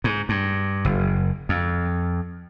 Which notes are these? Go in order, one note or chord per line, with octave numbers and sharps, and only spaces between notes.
G#2
G2
F#1
F2